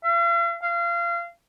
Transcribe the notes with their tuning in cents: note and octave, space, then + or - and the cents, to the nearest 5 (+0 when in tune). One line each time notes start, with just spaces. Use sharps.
F5 -45
F5 -30